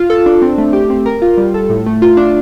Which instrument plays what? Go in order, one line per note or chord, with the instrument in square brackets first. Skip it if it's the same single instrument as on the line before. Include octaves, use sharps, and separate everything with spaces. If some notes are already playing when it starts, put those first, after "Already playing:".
Already playing: [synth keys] F4
A4
D4
C4
A3
G4
C4
A#4
F4
G3
A4
A2
A3
F4
D4